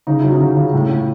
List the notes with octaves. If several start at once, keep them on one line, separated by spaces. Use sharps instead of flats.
C#3 D#4
F#3 E4
C#4 D#4
C#3
C#3
A2
A2